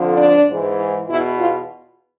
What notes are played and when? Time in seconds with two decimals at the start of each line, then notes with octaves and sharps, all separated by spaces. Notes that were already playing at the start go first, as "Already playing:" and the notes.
Already playing: F2 D3 F3
0.17 D4
0.48 G#2 E3
1.09 E2 B2 E4
1.40 F4